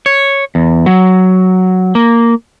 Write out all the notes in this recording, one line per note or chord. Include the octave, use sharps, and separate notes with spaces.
C#5
E2
F#3
A#3